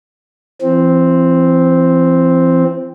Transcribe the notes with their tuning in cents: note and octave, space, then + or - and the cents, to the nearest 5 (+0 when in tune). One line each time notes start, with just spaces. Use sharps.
E3 +40 C4 +0